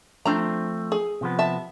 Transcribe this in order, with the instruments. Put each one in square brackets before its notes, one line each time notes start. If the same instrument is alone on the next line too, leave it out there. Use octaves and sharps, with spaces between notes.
[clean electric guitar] F3 A3 C4 [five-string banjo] D4 A#5
[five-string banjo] G#4
[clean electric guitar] C3 F3 B3
[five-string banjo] E5 A5